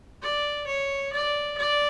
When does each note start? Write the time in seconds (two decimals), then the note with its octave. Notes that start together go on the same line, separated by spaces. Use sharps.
0.22 D5
0.67 C#5
1.13 D5
1.58 D5